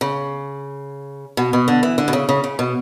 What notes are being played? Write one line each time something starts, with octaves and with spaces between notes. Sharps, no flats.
C#3
B2
B2
D3
E3
D3
B2
C#3
C#3
C#3
B2